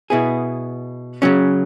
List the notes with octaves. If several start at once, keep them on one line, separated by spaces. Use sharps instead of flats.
B2 B3 E4 G#4
C#3 F#3 C#4